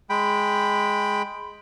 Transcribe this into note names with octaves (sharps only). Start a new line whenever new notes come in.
G#3 G5 B5